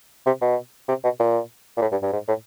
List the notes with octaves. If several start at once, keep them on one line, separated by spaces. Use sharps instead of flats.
C3
B2
C3
B2
A#2
A#2
A2
G2
G2
G#2
A2